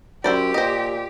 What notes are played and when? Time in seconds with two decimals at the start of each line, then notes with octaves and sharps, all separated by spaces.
0.24 F#2 E4 G4 C5 D5
0.54 A#2 C5 D#5